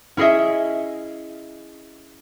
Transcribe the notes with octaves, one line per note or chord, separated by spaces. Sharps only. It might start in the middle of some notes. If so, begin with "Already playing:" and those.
C#4 E4 G#4 D#5 E5